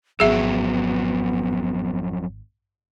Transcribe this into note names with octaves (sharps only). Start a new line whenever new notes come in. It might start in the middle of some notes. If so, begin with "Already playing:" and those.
G#1 F2 F#3 B3 G#4 E5